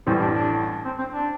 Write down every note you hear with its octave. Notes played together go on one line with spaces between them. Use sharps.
A1 A2 E3 G3 C4
D4
D4
C4
C4
D4